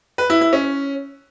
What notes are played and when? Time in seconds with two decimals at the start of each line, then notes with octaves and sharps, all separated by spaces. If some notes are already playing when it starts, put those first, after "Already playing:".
0.18 B4
0.30 E4
0.41 E4
0.53 C#4